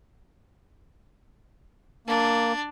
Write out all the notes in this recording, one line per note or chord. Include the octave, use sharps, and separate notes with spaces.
A#3 D4